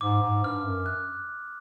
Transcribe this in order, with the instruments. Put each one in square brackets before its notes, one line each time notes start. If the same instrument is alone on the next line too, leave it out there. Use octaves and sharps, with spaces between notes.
[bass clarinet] G#2 [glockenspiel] D6
[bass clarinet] G#2
[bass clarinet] G2 [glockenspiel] F6
[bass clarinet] F#2
[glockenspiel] F#6